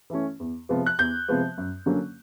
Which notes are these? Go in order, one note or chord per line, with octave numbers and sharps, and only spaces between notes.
E3 A3 C#4
E2
C3 F3 G#3 B3
F#6
E2 G6
C3 F3 G#3 B3
F#2
D3 F#3 A#3 C#4